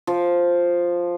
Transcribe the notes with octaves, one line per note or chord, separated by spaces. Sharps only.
F3